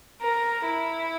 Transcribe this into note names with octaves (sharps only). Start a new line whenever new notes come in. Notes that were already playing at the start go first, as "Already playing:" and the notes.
A#4
E4